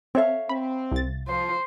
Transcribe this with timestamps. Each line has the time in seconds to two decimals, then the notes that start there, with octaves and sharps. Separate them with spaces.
0.15 C4 A4 C#5 E5 F5
0.49 C4 B5
0.92 C2 A6
1.28 F3 C5